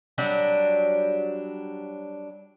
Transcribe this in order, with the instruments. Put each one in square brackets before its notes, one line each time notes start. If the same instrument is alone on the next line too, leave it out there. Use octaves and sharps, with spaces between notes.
[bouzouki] F#3 G3 D4